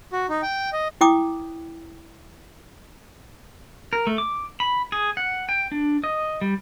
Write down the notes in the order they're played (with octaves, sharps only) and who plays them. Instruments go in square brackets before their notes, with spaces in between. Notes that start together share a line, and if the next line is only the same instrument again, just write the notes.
[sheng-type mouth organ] F#4
D#4
G5
D#5
[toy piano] E4 G5 D6 D#6
[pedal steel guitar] A#4
A3
D6
B5
G#4
F#5
G5
D4
D#5
G3